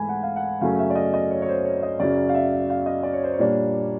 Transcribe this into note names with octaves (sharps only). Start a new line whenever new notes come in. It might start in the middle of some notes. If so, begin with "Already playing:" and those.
Already playing: G#2 E3 A3 G#5 B5
F#5
F5
F#5
F#2 C#3 F#3 A3 C#4 F5
E5
D5
D#5
D#5
C#5
C#5
C5
C#5
D#5
F#2 C#3 F#3 D5
F5
E5
F5
D#5
D5
C#5
C5
C#5
A#2 G3 A#3 D4